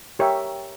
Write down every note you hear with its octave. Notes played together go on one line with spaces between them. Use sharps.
G4 A#4 C#5 E5 G5